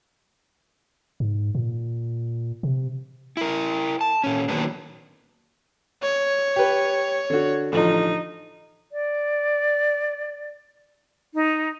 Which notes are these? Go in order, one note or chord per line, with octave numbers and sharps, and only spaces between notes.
G#2
A#2
C3
E4 A#4
A5
A#2 C#4
D#3 F#3 A#3 B3 D4
C#5
G4 B4
D3 F#4
A1 D3 F3 D#4
D5
D#4